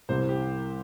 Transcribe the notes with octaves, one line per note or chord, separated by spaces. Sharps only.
C2 C3 E3 G3 C5
G4